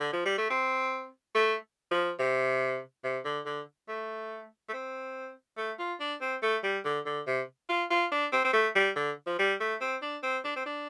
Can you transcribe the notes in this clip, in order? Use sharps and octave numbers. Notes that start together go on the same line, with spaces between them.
D3
F3
G3
A3
C4
A3
F3
C3
C3
D3
D3
A3
A3
C4
A3
F4
D4
C4
A3
G3
D3
D3
C3
F4
F4
D4
C4
C4
A3
G3
D3
F3
G3
A3
C4
D4
C4
D4
C4
D4